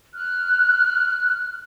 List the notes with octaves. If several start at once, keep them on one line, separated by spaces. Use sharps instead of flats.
F6 F#6